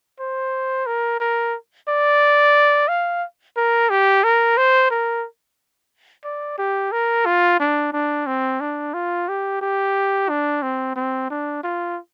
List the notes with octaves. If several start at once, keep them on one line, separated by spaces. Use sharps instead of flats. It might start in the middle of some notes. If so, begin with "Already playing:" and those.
C5
A#4
A#4
D5
F5
A#4
G4
A#4
C5
A#4
D5
G4
A#4
F4
D4
D4
C4
D4
F4
G4
G4
D4
C4
C4
D4
F4